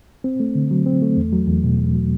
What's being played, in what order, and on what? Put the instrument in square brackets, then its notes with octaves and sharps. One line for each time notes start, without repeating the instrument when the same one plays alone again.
[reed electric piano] C4
A3
D3
F#3
C4
A3
E2
F#3
E2
B2
E2
F#3